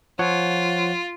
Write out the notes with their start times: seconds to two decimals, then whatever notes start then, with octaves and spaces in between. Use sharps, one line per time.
0.19 F3 F4 C#5 F#5